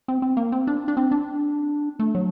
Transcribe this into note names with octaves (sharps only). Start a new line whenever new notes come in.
C4
C4
A#3
C4
D4
D4
C4
D4
A3
F#3